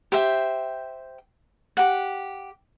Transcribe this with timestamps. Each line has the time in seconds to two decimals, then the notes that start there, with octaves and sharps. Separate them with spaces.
0.12 G4 C5 E5 G5
1.77 G4 F#5